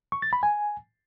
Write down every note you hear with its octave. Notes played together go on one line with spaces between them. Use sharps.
C#6
A6
B5
G#5